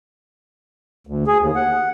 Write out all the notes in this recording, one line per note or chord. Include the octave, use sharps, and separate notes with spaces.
D2
G#4
D#2
F#5